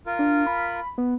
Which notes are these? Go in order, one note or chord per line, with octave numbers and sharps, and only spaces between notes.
F4 A#4
D4
B5
B3